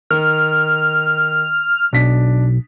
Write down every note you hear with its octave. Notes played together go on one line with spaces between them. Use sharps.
D#3 F6
B1 D4 B6